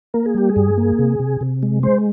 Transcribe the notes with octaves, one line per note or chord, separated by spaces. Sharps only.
A#3 A#4
G#4
G3 G4
G#4
G2
A#3
C3
C3
C3
G#3
G#3 C5